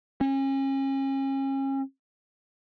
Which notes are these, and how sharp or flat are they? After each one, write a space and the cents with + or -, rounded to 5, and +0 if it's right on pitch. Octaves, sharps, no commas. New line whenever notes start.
C#4 -35